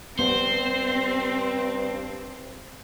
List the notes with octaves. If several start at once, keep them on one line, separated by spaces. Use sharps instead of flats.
G2 B3 C4 C5